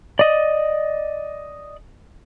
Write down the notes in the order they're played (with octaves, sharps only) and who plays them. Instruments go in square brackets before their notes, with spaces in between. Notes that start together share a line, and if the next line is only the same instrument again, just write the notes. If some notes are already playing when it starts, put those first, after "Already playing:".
[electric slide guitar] D5 D#5